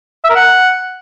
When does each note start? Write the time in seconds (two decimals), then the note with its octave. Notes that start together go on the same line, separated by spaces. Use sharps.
0.24 E5
0.30 A#4
0.35 F#5